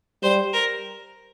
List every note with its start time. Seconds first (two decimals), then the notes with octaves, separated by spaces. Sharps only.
0.23 G3 C5
0.53 A#4